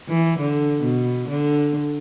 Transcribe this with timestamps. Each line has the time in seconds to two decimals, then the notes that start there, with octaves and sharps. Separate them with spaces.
0.09 E3
0.39 D3
0.83 B2
1.28 D3